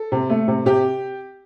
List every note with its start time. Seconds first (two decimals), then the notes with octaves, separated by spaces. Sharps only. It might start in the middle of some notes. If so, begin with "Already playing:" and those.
Already playing: A4
0.12 C3
0.30 A3
0.48 C3
0.66 C3 G4